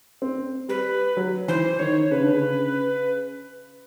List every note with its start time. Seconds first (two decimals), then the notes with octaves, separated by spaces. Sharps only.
0.22 C4
0.69 G3 B4
1.17 F#3
1.48 E3 C5
1.79 D#3 C#5
2.11 C#3 B4
2.22 D3
2.33 C#3